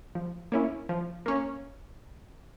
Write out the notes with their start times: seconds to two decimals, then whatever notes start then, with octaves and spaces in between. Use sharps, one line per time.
0.15 F3
0.52 A#3 C#4 E4
0.89 F3
1.26 A#3 C#4